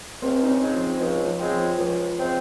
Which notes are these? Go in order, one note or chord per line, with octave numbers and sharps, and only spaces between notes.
C#2 C4
D#4
C#4
C#3 G#3 C4
F3
C#2 F3
F3
C#3 G#3 C4
F3
C#2 F3
C#3 G#3 C4